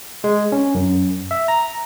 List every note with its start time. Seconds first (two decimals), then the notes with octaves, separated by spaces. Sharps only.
0.24 G#3
0.52 C#4
0.75 F#2
1.31 E5
1.48 A#5